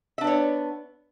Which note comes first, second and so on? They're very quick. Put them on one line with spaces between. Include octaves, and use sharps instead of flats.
E5 D4 B3 C#5